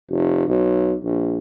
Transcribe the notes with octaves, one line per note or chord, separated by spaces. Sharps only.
F1
B1
A#1